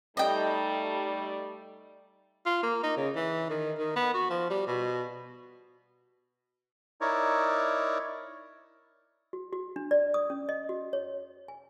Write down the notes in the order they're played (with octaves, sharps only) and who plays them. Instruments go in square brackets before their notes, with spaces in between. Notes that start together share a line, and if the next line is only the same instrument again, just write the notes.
[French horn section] G3 A3 D#4 [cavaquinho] D#5 G5
[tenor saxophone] F4
A#3
D#4
C#3
E3
D#3
D#3
B3
F#4
F3
G3
B2
[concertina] D#4 E4 A#4 C#5 D5
[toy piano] F#4
F#4
D4
D5
D#6
C#4
D#5
F#4
C#5
G#5